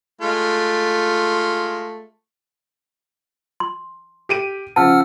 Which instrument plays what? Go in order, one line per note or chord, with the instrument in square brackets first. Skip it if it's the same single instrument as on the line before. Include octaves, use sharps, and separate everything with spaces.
[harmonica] G#3 A3 F4
[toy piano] C6
[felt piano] G4 D7 D#7
[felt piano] C#3 F3 [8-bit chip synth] F#5 E6 F6 [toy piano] A5